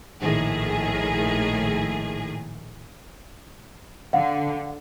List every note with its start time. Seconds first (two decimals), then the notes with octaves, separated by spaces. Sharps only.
0.21 A#1 A2 D#3 G#4
4.13 D3 F5 F#5